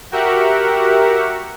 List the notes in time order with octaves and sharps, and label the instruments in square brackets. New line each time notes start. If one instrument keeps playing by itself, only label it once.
[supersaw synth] F#4 G4 A#4 E5 F#5